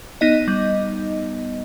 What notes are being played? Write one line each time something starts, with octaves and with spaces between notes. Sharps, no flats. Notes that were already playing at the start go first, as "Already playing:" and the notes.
B3 D#4 D#5
G3